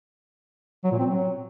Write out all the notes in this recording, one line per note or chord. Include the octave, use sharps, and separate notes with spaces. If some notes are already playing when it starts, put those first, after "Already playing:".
F#3
A#2
C4
F#3